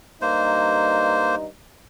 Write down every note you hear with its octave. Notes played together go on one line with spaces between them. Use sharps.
G2 A#3 D#4 C5